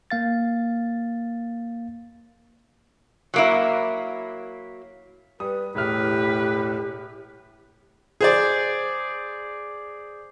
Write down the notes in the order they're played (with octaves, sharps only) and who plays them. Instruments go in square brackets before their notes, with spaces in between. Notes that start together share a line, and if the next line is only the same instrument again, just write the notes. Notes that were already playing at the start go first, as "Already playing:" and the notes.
[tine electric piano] A#3 F5 A6
[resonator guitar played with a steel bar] F#3 A#3 E4
[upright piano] G3 D#6 [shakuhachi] B4
[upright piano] E1 E4 F6 [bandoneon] A2 [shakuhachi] G4 [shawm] B4
[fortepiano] G#4 C5 D5